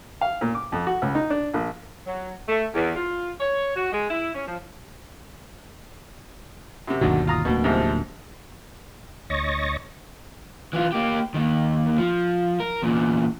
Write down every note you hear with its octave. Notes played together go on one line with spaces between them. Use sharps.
F5
A#2
D6
F2
F#4
C#2
D#4
D4
A#1
F#3
A3
E2
F4
C#5
F#4
G#3
E4
C#4
F3
F#2 C3
G1 D#2 B2 D3 D#3 F#3
F4 A#5 D#6
D1 D2 B2 A#3
G#2 C3 F3
D2 C#5 D#5 C#6 A6 A#6
E3 F4
A#3 G4
D#2 D#3
F3
A#4
E2 A#2